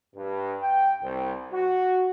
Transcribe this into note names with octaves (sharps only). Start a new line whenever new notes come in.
G2
G5
C2
F#4